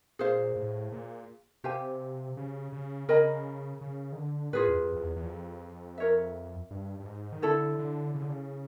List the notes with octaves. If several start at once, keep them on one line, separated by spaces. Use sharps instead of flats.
A#2 G#4 C5 F5
A2
A#2
C3 G4 C5 F5 G#5
C#3
C#3
C#3 A#4 D#5 G#5 B5
C#3
D#3
D3
A2 F4 G#4 B4
E2
F2
F2
E2
E2
F2
A#4 C#5 E5
G2
G2
G#2
D#3
D3 E4 A4 C#5
D3
C#3
D3
C#3